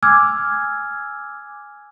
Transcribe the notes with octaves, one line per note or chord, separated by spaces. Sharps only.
G#5 D6 E6 F6 G#6